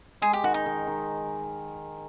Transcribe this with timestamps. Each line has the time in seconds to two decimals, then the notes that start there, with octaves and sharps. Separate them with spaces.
0.22 G#3 G#4
0.33 G4
0.44 D#3 F#4
0.54 D#4
0.66 D#3
0.87 D#3